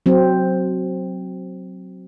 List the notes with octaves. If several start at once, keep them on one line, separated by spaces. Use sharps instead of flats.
F#3 C4